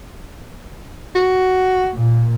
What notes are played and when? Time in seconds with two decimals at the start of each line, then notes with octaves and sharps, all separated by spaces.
1.16 F#4
1.94 A#2